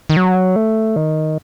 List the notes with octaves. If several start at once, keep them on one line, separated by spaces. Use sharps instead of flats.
D#3
F#3
A3
D#3